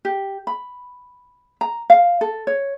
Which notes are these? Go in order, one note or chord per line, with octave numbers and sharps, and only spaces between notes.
G4
B5
A#5
F5
A4
C#5